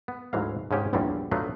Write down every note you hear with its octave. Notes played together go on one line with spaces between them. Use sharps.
B3
D2 G#2 E3 F#3 F5
G#2 C#3 C#4 G4
A#1 E2 G2 G3 C4 C#4
F#3 A3 B3 D4 F4